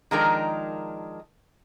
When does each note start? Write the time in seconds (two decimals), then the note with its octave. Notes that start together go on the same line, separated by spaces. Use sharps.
0.11 D#3 F3 G#3 D4 D#4 A#4